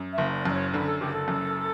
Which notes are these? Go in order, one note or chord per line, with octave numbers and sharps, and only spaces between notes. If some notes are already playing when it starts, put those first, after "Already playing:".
Already playing: F#2
E5
F#1
D5
F#2 D5
C#5
D3 B4
A4
F#1 G4
A4
F#2